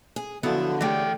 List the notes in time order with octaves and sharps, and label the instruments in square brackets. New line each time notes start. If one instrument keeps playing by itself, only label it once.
[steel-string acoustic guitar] G#4
[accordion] D3 [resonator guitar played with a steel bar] F3 B3 [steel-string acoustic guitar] F#3 E4
[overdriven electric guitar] E3 G5 [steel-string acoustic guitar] G#3 A3 [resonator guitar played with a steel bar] G4 C#5 D5